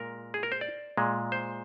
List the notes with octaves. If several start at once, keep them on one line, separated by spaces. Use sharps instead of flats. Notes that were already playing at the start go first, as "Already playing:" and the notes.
Already playing: A#2 G#3 A#4
G#4
A#4
C5
D5
A#2 G#3
C5